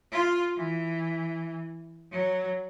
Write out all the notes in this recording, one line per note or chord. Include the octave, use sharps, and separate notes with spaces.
F4
E3
F#3